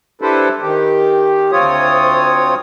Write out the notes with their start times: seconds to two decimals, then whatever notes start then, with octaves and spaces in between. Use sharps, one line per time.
0.21 D4 E4 G4 A4 B4 C5
0.62 D#3 G4
1.52 D2 C4 F4 C#5 D#6